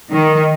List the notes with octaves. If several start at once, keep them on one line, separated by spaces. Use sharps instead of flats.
D#3